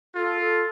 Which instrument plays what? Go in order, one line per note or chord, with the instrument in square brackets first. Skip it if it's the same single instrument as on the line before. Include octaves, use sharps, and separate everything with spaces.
[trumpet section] F4 [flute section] A4
[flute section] A4